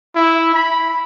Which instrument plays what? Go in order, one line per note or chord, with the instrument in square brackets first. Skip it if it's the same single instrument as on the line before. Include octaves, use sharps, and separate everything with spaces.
[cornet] E4
B5